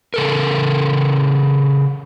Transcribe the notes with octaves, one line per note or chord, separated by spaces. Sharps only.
C#3 A4 A#4